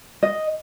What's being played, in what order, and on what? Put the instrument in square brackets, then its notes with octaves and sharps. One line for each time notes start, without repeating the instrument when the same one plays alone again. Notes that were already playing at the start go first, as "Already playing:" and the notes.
[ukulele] D#5